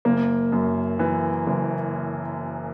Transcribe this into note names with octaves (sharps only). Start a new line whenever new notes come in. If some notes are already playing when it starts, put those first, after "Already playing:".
F#1 A#3
F#2
E3
F#1